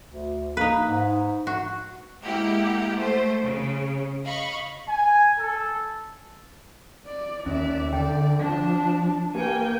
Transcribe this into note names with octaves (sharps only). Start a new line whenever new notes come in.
D2
A#3 D#4 B4
G#2
F#4
G#3 A#3 E4 G4 F#5
A3 C5
C#3
D#5 F5 B5 C#6
G#5
A4
D5
D#2 C#4 D5 E5
D3 D5 G5
F3 D4 A5
A#3 G4 B4 G5 G#5